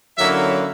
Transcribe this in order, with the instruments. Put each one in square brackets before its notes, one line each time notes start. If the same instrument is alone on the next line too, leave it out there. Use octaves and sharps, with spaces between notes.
[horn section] D3 F#3 A#3 C#4 E4 E5